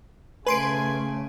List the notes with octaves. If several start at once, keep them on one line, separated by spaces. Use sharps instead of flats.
C#3 A3 B4 G#5 C6 D7